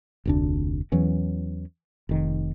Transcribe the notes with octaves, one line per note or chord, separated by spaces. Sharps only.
F1 D2 D4
E2 E3 F#3 C#4
F1 D#3